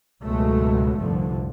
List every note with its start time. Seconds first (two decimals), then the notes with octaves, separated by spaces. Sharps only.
0.24 C#2 G#2 B2 F#3 G#3 A3
0.99 F1 C2 G2 D3 F3